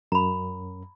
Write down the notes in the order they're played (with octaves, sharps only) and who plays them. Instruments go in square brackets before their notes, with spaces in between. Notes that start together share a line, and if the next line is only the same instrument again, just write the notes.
[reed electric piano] F#2 [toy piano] A#5 B5